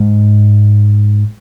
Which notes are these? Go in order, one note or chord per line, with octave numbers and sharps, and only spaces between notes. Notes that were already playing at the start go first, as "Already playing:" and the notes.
Already playing: G#2